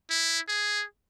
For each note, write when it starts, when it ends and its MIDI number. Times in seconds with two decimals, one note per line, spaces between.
0.10 0.39 64
0.48 0.84 68